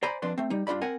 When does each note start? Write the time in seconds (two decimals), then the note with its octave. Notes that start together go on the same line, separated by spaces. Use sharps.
0.03 C5 D5 G#5 A#5 B5
0.22 F2 D4 B4 C6
0.38 A3 C4
0.50 G3 D#4
0.67 G2 D4 F4 D5 B5
0.82 C4 A#4 F#5 G#5